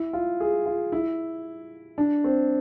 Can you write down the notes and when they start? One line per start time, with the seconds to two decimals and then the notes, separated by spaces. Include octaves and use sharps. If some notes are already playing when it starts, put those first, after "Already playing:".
Already playing: E4
0.13 F4
0.40 G#4
0.66 F4
0.92 E4
1.98 D4
2.24 C4